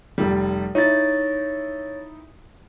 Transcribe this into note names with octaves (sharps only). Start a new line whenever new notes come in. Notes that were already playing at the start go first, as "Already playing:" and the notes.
F1 G3
D#4 E4 C#5 A6